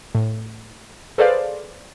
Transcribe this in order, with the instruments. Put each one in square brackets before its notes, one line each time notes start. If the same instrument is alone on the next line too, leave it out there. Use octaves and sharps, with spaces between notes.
[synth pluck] A2
G#4 A4 B4 C5 D5 F5